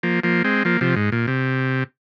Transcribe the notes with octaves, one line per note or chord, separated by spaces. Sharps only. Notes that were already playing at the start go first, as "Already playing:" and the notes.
F3 A#3
F3 A#3
G#3 C4
F3 A#3
C3 F3
G#2
A#2
C3